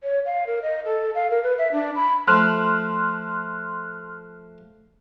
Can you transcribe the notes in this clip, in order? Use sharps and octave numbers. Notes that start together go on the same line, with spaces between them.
C#5
F5
A#4
D#5
A4
F5
A#4
B4
E5
D4
B5
F3 A3 C6 F6 F#6